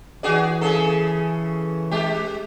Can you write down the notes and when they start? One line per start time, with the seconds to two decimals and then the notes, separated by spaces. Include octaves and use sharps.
0.23 E3 F#4 G#4 D5
0.61 C#3 G#4 A4
1.91 G#3 G4